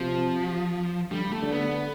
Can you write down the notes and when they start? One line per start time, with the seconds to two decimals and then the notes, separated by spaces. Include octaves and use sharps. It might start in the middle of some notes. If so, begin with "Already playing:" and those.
Already playing: C3 F3
1.11 D3 G3
1.32 A3
1.42 D3
1.52 B3